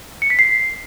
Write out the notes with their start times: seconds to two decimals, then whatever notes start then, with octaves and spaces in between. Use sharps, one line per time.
0.22 C#7
0.30 B6
0.39 C7